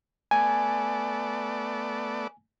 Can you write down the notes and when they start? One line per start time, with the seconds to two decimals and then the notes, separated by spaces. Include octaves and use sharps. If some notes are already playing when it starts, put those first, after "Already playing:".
0.31 A3 B3 D5 G#5